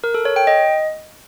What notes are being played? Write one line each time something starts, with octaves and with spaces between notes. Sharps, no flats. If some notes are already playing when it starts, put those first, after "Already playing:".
A#4
A4
C#5
G5
D#5